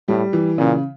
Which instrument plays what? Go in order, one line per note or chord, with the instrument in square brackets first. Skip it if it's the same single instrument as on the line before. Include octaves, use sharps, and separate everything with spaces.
[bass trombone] A2 [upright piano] G3
[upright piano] E3
[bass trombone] A#2 [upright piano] C#3